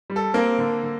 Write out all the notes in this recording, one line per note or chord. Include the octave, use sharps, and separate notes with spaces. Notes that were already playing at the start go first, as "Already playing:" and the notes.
G3
A4
A#3 C4 A#4
D3
D3